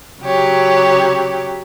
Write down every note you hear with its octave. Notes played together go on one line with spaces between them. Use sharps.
C#3 F#3 G4 C#5